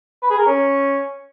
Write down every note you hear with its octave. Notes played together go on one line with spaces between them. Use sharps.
B4
G#4
A#4
C#4